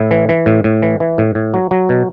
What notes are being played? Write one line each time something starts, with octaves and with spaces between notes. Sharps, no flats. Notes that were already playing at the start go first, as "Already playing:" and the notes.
Already playing: A2 E4
E3
E3
A2
A2
E3
E3
A2
A2
F#3
F#3
B2